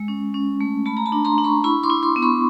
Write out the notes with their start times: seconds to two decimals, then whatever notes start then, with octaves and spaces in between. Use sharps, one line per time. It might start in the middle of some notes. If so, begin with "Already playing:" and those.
Already playing: G#3
0.08 C#4
0.34 C#4
0.61 A3
0.86 A3 A5 B5
0.97 A#5
1.06 A5 B5
1.12 D4
1.25 A#5 C6
1.38 D4
1.44 B5 C#6
1.64 E4 B5 C#6
1.83 C6 D6
1.90 E4
2.03 C6 D6
2.16 B3
2.22 B5 C#6